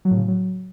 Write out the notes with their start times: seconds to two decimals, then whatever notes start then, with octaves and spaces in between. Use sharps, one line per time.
0.05 F#3
0.11 A2
0.16 C#3
0.22 A2
0.28 F#3